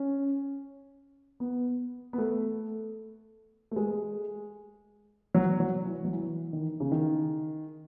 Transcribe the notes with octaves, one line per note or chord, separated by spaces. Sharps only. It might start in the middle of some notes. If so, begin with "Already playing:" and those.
Already playing: C#4
B3
B3
A3
A3
G#3
F#3
F#3
E3
F#3
E3
D#3
C#3
D#3